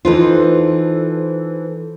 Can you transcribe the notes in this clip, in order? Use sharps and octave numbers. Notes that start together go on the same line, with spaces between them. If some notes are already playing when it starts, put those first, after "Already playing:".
E3 D#4 F4 A4 B4 C5